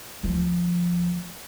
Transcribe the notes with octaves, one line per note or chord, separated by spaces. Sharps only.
D2 F3